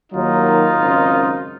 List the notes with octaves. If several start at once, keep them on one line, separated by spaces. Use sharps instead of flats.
D#2 D#3 F#3 D#4 F4
G#1 F#2 C#3